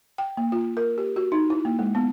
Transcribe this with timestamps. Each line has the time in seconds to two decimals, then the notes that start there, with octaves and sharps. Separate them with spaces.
0.18 G5
0.37 A#3
0.52 F4
0.77 A#4
0.98 G4
1.16 F#4
1.32 D#4
1.50 E4
1.65 A#3
1.79 G#3
1.95 B3